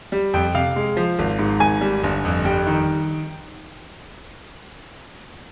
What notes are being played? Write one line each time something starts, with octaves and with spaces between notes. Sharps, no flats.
G3
F2 G5
C3 F5
G#3
F3
G#1
G#2
G#1 G#5
G3
G1
F2
G3 G5
D#3